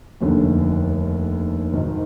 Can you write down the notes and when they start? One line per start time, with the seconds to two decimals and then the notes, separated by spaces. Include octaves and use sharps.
0.21 F1 D#2 D3
1.73 G#1 G#2 D#3